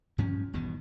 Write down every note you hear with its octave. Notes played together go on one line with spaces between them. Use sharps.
G2 F3 C#4
G1 E2 B2 D#3